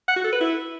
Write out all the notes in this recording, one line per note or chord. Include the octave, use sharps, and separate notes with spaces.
F#5
F#4
A4
B4
E4